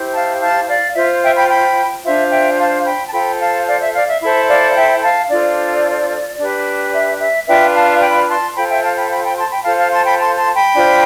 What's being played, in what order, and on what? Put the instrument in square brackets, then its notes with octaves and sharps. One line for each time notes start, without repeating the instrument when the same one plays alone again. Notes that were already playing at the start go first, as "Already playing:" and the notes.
Already playing: [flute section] E4 G4 C5
F5 A5
F5 A5
D5 F5
F4 C5 E5
E5 G5
G5 B5
G5 B5
D4 F4 C5 E5
E5 G5
F5 A5
G5 B5
A5
F4 A4 C5 G5 B5
F5 A5
D5 F5
E5
D5 F5
E5
E4 A4 C5 E5
D5 F5
E5 G5
F5 A5
D4 F4 A4 C5 D5
D4 G4 B4
E5
E5
D4 F4 B4 E5 G5
F5 A5
G5 B5
A5 C6
F4 A4 C5 G5 B5
E5 G5
F5 A5
G5 B5
G5 B5
G5 B5
A5 C6
G5 B5
F4 A4 C5 F5 A5
F5 A5
A5 C6
G5 B5
A5 C6
A5 C6
G5 B5
D4 F4 C5